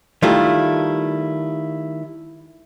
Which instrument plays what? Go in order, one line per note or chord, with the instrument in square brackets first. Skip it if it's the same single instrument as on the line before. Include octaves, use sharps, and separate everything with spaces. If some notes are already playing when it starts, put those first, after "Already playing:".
[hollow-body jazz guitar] D#3 G3 A3 E4 F4